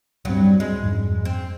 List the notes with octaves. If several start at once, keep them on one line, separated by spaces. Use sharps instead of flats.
D1 G2 F#3 C4
G#3
F2 G#2
C4